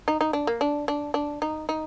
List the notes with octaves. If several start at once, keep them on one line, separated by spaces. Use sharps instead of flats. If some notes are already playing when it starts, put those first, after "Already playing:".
D#4
D#4
D4
A#3
D4
D4
D4
D#4
D#4